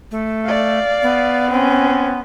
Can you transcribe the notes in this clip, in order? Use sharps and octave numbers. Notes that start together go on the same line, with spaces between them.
A3
D5 F5
B3
C4 C#4